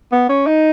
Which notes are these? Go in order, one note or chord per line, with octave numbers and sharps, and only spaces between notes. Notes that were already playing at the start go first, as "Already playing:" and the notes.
B3
C#4
D#4